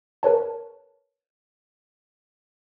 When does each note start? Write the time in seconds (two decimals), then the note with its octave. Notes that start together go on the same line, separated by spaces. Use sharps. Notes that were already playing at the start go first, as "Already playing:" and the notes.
0.23 A#4 B4 C#5 A5